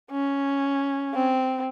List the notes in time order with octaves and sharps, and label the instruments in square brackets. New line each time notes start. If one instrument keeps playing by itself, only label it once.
[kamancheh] C#4
C4